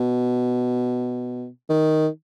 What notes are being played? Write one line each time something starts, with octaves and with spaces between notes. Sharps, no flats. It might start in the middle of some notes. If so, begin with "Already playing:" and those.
Already playing: B2
D#3